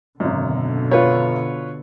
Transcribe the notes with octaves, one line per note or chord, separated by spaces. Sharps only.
G#1 F#2 B2 D3
F4 B4 C#5